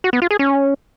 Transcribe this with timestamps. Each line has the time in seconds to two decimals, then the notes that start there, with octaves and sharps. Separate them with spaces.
0.04 F#4
0.13 B3
0.22 F4
0.31 G#4
0.39 C#4